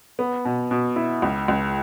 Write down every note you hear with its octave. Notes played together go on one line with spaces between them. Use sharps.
B3
B2
B2
E4
C#2
C#2